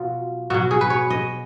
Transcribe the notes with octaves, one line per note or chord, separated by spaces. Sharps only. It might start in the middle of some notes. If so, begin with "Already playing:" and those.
Already playing: B2 F#3 F4
B2 F#3 F#4
G#4
B4
C#5
D#5